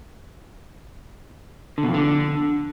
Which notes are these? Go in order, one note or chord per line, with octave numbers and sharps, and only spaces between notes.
D3
B2
F2
D3